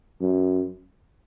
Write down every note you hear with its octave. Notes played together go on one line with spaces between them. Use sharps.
F#2